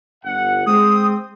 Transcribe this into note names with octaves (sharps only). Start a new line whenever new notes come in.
G1 F#5
G#3 C4 D#6